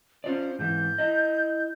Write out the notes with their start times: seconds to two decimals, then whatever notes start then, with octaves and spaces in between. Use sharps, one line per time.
0.24 C#4 F4 C5 D5
0.59 G#2 E3 G6
0.98 E4 D#5